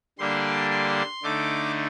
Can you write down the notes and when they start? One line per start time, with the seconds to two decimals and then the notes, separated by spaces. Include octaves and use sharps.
0.19 D3 G3 A#3 D4 C6
0.71 C6
1.23 D3 A3 D#4 D6